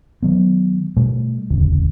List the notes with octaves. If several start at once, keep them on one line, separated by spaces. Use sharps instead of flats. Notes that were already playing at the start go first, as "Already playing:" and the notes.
D#3 F#3 B3
B2 G3 A3
E1 A1 D2 C#3